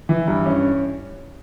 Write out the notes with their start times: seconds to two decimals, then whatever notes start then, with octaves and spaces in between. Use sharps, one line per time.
0.09 E3
0.28 G2
0.46 C#4